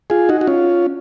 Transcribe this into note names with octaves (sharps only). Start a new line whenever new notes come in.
F4 G#4
D#4 F#4
F#4
C#4 F4